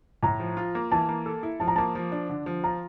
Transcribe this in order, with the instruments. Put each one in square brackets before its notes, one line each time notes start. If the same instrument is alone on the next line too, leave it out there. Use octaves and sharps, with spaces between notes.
[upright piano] A2 [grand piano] A#5
[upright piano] F3
F4
A#3
[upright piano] E3 [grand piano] A5
[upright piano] A#3
A4
E4
[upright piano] F3 [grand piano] A5
[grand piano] A#5
[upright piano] A#3 [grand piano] A5
[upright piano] F3
D4
D3
F3
[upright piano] F4 [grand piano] A#5